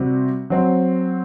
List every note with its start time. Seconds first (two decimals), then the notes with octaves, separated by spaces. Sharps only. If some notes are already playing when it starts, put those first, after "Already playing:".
Already playing: C3 G3 C4 F#4
0.50 F#3 C4